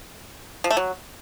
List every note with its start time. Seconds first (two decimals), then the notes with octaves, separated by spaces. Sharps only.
0.64 F3
0.71 A3
0.77 F#3